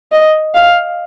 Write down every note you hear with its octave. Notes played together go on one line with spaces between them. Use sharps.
D#5
F5